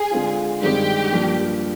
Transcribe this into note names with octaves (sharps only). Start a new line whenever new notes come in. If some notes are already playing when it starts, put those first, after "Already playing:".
Already playing: G#4
D3 G#3 C4 F4
G2 D#3 G#3 C4 D#4 G4
G2 F3 A#3